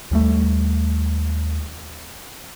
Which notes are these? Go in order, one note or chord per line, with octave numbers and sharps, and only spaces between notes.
D#2 G3 A3